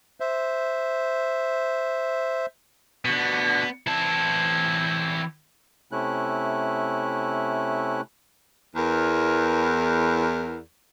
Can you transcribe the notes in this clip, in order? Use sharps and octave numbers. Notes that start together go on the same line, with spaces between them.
C5 E5
B2 D3 B3
E3 C4 E4 A5
C3 A3 C#4 E4 F#6
E2 A#4